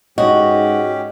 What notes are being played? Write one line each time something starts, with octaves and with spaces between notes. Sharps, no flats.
G#2 C#4 F#4 G4 D#5